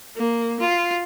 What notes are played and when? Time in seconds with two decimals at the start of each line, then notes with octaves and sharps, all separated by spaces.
0.17 A#3
0.60 F4